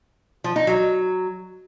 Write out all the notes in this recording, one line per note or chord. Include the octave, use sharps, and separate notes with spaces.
F3
D#4
F#3